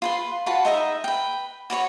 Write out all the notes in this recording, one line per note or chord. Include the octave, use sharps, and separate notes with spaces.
F4 B4 C6
F4 F#4 B4 A5
D#4 D#5 E5 A#5
B4 G5
F#4 B4 C#5 C#6